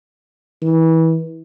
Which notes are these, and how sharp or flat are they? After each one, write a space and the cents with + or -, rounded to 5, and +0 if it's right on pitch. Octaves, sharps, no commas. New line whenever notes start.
E3 -25